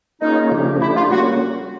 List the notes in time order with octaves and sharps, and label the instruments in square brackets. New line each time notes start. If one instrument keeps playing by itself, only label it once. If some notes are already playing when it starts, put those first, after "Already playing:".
[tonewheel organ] A#3 C#4 F4 G#4 [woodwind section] D#4
[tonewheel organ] C#3 F3 A3 D4 G4
[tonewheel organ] A3 D4 G4 [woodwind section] E4
[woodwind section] F4
[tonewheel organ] G3 A#3 C#4 [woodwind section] F#4